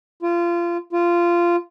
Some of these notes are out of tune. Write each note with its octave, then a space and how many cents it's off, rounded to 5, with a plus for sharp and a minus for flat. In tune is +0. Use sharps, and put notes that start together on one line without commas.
F4 -25
F4 -15